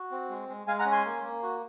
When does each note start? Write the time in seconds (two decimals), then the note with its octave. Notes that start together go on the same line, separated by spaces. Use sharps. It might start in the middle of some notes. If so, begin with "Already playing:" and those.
Already playing: F#4
0.11 C4
0.30 G#3
0.49 G#3
0.67 G#3 F5 G#5
0.79 F#5 A#5
0.85 C#4
0.92 G#5 C6
1.05 A#3
1.24 A#3
1.43 F#4